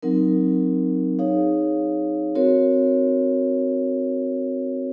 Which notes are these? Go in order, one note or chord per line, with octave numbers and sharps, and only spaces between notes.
F#3 C4 D#4 A#4
D#4 G#4 C#5 F5
C4 F#4 A#4 C#5